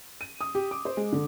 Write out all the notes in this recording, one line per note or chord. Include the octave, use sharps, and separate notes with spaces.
D#7
D#6
G4
D6
C5
G#3
D3